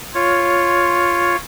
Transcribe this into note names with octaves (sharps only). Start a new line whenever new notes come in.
F4 C#5